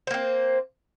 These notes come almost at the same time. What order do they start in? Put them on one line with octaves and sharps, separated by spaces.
C5 A#3 C4